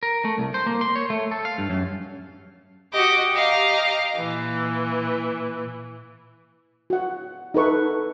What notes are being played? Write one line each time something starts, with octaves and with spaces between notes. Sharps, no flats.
A#4
A3
C2
C5
A#3
C6
C#5
A3
A4
F5
G2
F#2
F#4 G4 D#5 D6
G4 D#5 F5 A#5
A#2 E3
F#4 F#5
D#4 A4 B4 C#6